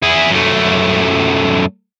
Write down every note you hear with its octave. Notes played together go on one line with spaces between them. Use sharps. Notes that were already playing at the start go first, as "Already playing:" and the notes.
E4 G#4
F#2 A3